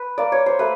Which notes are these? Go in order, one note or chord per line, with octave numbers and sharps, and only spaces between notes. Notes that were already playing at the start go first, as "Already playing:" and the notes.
Already playing: B4
A#3 D5
C#5
C5
A3 B4